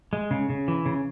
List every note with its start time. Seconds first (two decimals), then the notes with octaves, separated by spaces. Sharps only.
0.13 G#3
0.31 C#3
0.50 C#3
0.68 E3
0.86 C#3